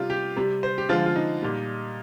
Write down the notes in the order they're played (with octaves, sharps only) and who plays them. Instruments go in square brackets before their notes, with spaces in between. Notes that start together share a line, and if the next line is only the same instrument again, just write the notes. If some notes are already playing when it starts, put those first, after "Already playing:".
Already playing: [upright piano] C3 G3 F4
G4
C3 G3
C5
G4
D3 F3 G#3 F4
F4
D#4
A#2 G3